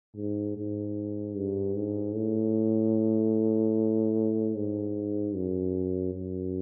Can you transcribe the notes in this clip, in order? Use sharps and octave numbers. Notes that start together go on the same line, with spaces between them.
G#2
G#2
G2
G#2
A2
G#2
F#2
F#2